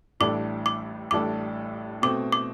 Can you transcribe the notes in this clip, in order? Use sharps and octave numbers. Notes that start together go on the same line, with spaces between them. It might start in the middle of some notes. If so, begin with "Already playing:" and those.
A1 A2 G3 D4 A4 D6
D6
A1 A2 G3 D4 A4 D6
B2 A3 C4 D6
D6